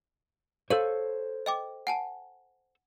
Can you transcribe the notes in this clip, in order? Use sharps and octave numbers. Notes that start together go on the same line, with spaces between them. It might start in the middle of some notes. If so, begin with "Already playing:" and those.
A4 C5 C#5 F5 D#7 F#7
D#5 G5 D6
F#5 G#5 A5